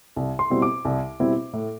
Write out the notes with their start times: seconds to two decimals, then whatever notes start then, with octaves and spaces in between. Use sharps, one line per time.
0.16 C2
0.39 C6
0.50 B2 G3 C4 E4
0.62 D6
0.85 C2
1.19 B2 G3 C4 E4
1.53 A2